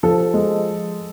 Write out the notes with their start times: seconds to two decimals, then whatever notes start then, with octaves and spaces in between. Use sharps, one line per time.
0.03 F3 A4
0.34 G#3